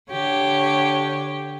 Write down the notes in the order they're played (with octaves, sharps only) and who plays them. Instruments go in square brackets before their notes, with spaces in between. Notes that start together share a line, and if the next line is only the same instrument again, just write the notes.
[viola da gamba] D3 G4 C#5